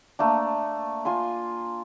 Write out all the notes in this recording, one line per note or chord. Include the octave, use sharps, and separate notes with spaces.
A3 A#3 D4
F4 G#5 C6